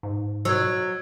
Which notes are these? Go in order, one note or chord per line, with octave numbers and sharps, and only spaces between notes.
G#2
F#3 E6 G#6